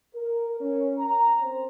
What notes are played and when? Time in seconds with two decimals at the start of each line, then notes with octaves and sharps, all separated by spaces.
0.15 A#4
0.61 C#4
0.99 A#5
1.40 C4